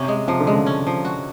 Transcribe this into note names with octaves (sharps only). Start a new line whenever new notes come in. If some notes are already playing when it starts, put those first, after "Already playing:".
Already playing: C3 C#4
G#3
C3 F3
D3
C#3 G#3
C#4
F3
F#4